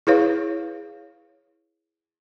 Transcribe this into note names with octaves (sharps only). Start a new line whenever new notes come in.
E4 G#4 B4 C#5 F5